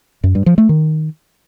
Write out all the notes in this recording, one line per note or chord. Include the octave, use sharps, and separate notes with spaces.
F#2
G2
F3
A3
D#3